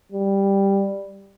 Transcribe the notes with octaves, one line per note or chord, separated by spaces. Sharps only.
G3